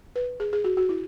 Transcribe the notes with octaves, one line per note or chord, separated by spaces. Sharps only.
B4
G#4
G#4
F#4
F#4
E4